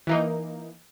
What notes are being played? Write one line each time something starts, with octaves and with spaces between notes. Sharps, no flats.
E3 A#3 D#4